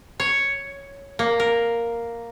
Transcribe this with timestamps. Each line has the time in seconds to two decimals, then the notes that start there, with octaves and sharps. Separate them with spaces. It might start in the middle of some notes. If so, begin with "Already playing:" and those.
0.20 C#5
1.19 A#3
1.40 A#4